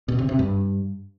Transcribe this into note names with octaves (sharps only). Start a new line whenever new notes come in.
B2
C3
C3
G2